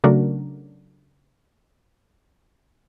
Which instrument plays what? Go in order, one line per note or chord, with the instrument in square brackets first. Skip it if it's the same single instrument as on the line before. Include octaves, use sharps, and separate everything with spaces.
[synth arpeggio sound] C#3 F#3 A3 D4 F#4 A#4